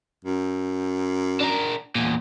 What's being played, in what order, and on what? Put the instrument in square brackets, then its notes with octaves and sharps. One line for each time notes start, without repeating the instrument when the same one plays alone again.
[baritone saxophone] F#2
[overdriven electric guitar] D4 A#4
E2 A#2